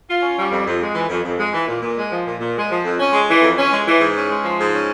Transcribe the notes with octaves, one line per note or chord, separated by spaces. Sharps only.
F4
C#4
G3
F2
F2
G#3
E3
F2
F2
G#3
E3
A#2
A#2
G#3
F3
A#2
A#2
G#3
F3
F2
C#4
G#3
E3
F2
C#4
G#3
E3
G#2
C#4
G#3
F3
G#2
C#4